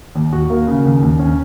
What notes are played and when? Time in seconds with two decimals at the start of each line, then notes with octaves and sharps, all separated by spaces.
0.15 D#2
0.33 F#4
0.50 A#3
0.67 C#3
0.85 D#2
1.02 D#2
1.19 C#4